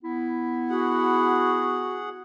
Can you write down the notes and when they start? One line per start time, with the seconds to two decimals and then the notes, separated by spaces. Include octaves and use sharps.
0.03 B3 E4
0.70 F#4 G#4 F#5